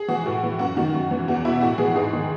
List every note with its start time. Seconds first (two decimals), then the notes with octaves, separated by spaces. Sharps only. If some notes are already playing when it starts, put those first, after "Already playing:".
Already playing: G#4
0.08 E3 F#4
0.26 A2
0.43 E3
0.59 F#2 F#4
0.77 D#3 F#4
0.94 F#2
1.11 E3
1.28 E2 F#4
1.45 B2 E4
1.61 A2 F#4
1.78 E3 G#4
1.95 G#2 G#4
2.13 D#3